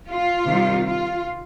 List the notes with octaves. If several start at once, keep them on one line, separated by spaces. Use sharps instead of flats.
F4
C3 D#3 G3
F4